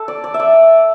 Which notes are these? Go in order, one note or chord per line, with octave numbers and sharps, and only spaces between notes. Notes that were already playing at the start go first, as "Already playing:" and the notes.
Already playing: A4
D5
D5
E5
D5